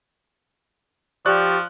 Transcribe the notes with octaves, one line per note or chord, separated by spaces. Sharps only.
F3 G4 D5 C#6 F#6